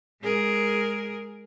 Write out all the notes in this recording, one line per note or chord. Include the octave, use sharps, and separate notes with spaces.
G#3 G#4 A#4